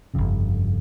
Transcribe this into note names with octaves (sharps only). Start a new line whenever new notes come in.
G1 F2 C#3